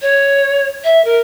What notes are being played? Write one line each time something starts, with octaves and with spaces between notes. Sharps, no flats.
C#5
E5
A#4